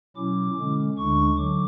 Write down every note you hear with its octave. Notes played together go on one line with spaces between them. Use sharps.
B2 F#3 C#4 E4 D6
D3 G#3 C#4
D2 D3 G#3 D4 C#6
D3 F#3 D6